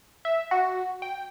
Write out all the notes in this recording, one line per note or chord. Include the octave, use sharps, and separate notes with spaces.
E5
F#4
G5